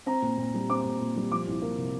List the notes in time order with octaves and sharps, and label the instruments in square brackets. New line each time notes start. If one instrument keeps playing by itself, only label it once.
[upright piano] C4 A#5
A#2
A#2
G3
C4 D6
A#2
A#2
G3
F3 D6
C2
A#3
C3